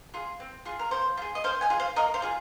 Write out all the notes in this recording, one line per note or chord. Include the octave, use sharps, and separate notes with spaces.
F4 G#4
C4
F4 G#4
A#4
A#3 C5
F4
G#4
D#5
A#3 C5 F5
D#5 G#5
F4 G#4
C5 F5
A#3 A#4 D#5
C5 F5
F4 G#4